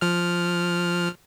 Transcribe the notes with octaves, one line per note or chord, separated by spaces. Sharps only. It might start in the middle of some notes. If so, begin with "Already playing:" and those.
F3 F6